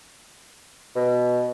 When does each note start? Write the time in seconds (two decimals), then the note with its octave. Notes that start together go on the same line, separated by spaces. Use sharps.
0.96 B2